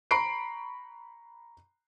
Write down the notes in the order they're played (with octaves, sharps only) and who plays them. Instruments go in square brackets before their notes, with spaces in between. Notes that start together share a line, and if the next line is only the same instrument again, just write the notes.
[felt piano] A#5 B5 C#6 C7 D7